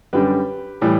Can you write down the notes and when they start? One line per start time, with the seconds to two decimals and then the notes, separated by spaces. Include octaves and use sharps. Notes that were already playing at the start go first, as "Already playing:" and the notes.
0.13 F#2 D3 G3 G4 B4
0.81 A2 E3 G3